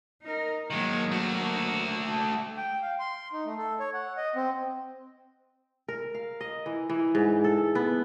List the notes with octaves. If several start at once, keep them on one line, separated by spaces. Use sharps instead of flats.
D#4 A#4
D#3 F#3 G#3 A#3
A3 F#4
G5
F5
C6
D#4
A3
A4
C#5
F#5
D#5
C4
A#4
F5
D#5
E3
E3
G#2
A4
B3